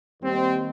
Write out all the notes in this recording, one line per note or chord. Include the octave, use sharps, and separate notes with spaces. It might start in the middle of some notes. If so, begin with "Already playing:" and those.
D#2 D#3 G3 C4